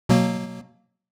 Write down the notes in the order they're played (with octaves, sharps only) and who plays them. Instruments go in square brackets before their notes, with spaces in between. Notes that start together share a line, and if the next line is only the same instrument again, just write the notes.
[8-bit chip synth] B2 F#3 A#3